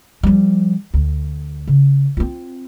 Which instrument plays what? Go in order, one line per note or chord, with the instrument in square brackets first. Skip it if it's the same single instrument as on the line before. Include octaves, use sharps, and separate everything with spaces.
[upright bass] F3 G3
D2
C#3
C4 F4